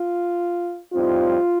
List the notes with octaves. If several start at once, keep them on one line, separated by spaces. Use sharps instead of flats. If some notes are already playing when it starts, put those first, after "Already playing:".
Already playing: F4
A2 G3 C4 D#4 F4